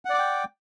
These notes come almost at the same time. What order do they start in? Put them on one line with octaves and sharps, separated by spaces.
F#5 D5 D6 G5